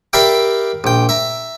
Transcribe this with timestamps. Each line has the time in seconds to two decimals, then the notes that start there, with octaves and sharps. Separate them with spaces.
0.13 G4 A#4 D5 E5 F5 B5
0.84 A#1 G5
1.09 E5 A#5